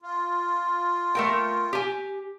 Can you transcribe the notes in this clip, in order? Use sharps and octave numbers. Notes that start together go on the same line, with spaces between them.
F4
A3 A#4 G5
G4 G#5